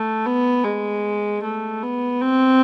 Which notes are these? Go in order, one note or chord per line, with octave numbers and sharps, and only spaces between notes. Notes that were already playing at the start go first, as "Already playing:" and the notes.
Already playing: A3
B3
G#3
A3
B3
C4